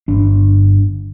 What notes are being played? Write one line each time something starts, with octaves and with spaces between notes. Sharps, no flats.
G1 D4